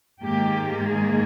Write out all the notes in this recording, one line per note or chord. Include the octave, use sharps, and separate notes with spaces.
G#2 D#3 A#3 G4
G#4